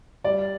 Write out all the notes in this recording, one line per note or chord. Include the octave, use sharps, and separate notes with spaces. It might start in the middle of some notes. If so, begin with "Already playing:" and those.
G3 D5